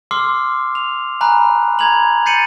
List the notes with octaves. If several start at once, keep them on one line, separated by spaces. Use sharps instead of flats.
C6 D6 E6 F6 C7
F7
G#5 A#5 B5 F#6
A#5 B5 G#6 F7 F#7
G6 A6 C7 C#7 D#7 F#7